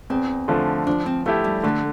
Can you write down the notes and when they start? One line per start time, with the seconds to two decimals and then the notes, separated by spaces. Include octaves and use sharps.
0.10 E2 C4
0.48 D3 F3 A3
0.87 F3 D4
1.06 C4
1.26 A3 B3 E4 G4
1.44 G3
1.63 D3 A3